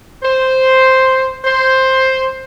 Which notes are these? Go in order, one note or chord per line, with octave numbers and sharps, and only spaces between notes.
C5
C5